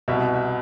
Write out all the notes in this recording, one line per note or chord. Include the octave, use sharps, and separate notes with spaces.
C2 B2 E5
E5